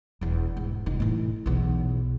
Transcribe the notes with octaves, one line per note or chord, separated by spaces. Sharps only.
E1 E2
G#2
F1 D#4
A2 E3
B1 E2